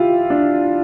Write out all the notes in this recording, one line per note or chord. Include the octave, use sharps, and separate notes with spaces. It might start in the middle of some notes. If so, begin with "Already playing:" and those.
Already playing: E4 F4 G4
D4